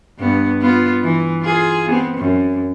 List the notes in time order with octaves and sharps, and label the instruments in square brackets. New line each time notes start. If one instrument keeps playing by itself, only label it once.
[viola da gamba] G2 B3
B3 F4
E3
F4 G#4
B3 C4
F#2